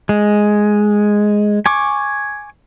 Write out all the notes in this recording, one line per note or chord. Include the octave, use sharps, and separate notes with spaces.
G#3
G#5 C#6 D6